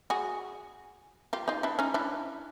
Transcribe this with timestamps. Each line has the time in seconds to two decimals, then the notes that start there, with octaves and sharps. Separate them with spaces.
0.10 F#4 G#4
1.33 F4 G4
1.48 D#4 F4
1.63 D4 E4
1.79 C#4 D#4
1.94 D4 E4